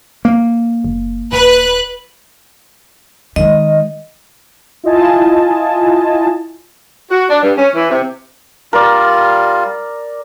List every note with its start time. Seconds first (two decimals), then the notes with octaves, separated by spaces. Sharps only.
0.25 A#3
0.84 F#1
1.32 D#1 B4 F#6
3.36 D#3 G#3 D#5
4.83 E4 F4 D#5 G#5 A5
7.10 F#4
7.29 D4
7.42 G2
7.56 C#4
7.74 E3
7.89 C3
8.73 G3 F4 A#4 D5